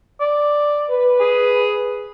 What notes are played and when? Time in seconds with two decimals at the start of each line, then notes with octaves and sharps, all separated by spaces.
0.20 D5
0.89 B4
1.20 G#4